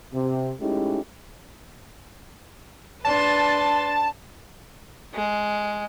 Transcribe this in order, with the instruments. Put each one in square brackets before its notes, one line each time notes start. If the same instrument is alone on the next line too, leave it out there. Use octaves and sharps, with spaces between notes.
[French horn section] C3
G#3 A3 C#4 D#4 E4 G4
[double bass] D4 [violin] B4 C6 [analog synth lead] A5
[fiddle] G#3